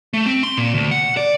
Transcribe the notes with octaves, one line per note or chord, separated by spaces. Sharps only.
A3
C4
C6
A#2
D2
F#5
D5